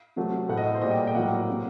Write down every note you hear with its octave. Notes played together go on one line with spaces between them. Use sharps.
C3 F#3 A3
A2 A3 F#5
D#5
C5
A#2 G3 A#3 D#5
G5
G5
A2 F#3 A#3 F#5
C3 G3 A#3